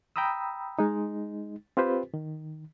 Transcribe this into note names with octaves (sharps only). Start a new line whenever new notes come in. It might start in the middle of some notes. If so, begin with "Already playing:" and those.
G5 A#5 B5 D#6 E6
G#3 D#4
C4 F4 G4 B4 C5
D#3